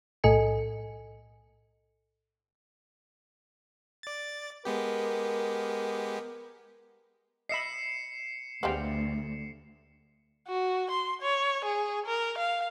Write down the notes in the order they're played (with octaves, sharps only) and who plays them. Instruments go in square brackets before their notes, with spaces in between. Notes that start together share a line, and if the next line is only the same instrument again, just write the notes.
[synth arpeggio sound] B1 A2 A4 D#5 G#5 C#7
[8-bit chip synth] D5 A6
[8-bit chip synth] G#3 B3 G4 [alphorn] A#4
[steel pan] D#5 E5 B5 [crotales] C7 C#7 E7
[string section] D2 [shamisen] G3 G#3 B3 [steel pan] C5 F5 G5
[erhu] F#4
C6
C#5
G#4
A#4
F5